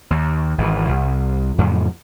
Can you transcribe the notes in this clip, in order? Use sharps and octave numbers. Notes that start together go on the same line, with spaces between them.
D#2
G#1 C#3 E3
C2
F2 A2 C#3 F#3